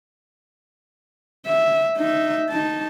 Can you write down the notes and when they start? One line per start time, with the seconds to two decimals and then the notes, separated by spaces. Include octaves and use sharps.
1.46 E5
1.97 D#4 E5
2.50 D#4 A5